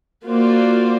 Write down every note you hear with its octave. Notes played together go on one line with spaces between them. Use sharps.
A#3 F4 F#4 C5 D5